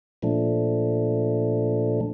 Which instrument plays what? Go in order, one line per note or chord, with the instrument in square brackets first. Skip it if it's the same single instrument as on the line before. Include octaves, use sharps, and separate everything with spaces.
[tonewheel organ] A#2 F3 A3 D4